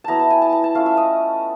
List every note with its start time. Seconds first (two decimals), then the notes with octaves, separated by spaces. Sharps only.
0.04 F#3 B3 E4 A5 A#5
0.19 A5
0.30 G#5
0.42 A5
0.52 A#5
0.64 A5
0.75 A3 C#4 F4 F5
0.86 E5
0.97 D#5